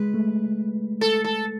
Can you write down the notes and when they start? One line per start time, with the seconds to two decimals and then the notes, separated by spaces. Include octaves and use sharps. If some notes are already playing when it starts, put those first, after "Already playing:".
Already playing: G#3 B4
0.14 A3
1.01 A4
1.24 A4